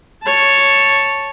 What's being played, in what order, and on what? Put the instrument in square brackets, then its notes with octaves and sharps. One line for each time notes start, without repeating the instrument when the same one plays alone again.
[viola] C#5 A5